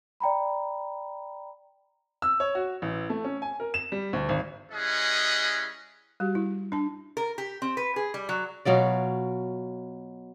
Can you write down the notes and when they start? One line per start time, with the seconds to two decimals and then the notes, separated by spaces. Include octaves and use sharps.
0.20 D5 G5 A#5 B5
2.22 E6
2.40 C#5
2.55 F#4
2.82 A1
3.10 A3
3.24 C#4
3.42 G#5
3.60 A#4
3.74 E7
3.92 G3
4.13 D2
4.29 G#1
4.72 G3 C#4 E4 G#4 D#5 F#5
6.20 G3 F#4 G4
6.35 E4
6.72 D4 A5
7.17 A#4
7.38 G4
7.62 C4
7.77 B4
7.96 G#4
8.14 G3
8.29 F#3
8.65 B2 F#3 F4 D5